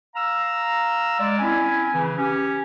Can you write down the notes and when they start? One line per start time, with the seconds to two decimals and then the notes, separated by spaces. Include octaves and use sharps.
0.16 F5 A#5 E6
1.20 G#3 D5
1.39 C4 C#4 E4 G#5
1.94 C#3 E3
2.18 C#4 G4